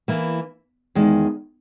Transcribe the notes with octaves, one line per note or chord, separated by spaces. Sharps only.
E3 A#3 E4
E2 D#3 G#3